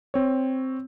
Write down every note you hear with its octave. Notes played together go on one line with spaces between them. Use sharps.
C4 C#5